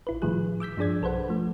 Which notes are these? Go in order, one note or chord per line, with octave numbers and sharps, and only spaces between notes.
A1 E4 B4
A2 D#3 F3 G3 G#4 F#6
D6 E6 G6 B6
G2 F3 D4 G#4 D5 G#6
B1 A4 B4 C5 F#5
F3 A3